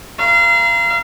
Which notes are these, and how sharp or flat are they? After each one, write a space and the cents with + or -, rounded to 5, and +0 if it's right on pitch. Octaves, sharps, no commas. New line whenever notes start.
F5 -30 A#5 +25